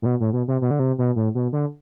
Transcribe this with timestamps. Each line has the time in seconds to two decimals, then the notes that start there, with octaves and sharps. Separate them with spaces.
0.02 A2
0.06 B2
0.20 A2
0.33 B2
0.48 C3
0.61 B2
0.71 D3
0.79 C3
0.98 B2
1.16 A2
1.35 B2
1.53 D3